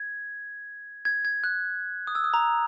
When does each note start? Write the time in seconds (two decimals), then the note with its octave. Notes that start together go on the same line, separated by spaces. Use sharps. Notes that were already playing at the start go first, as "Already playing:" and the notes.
Already playing: G#6
1.05 G#6
1.25 G#6
1.44 F#6
2.07 D#6
2.15 E6
2.24 D#6
2.34 A#5